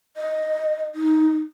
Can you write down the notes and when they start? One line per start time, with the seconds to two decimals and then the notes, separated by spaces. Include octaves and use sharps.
0.17 D#5
0.95 D#4